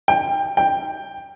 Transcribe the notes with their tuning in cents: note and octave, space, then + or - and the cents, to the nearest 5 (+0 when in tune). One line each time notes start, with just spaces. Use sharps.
G5 +20
G5 +10